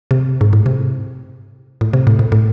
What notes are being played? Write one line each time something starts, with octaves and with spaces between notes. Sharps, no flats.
C3
G#2
A2
C3
A2
C3
A2
A2
A2